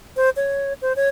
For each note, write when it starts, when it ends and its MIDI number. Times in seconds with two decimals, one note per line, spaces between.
0.16 0.30 72
0.36 0.73 73
0.82 0.93 72
0.96 1.09 73